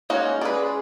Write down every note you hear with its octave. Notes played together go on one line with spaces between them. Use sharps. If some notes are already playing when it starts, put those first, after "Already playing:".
G#3 A#3 C#4 D#4 F#4 C#5
G#4 B4 D5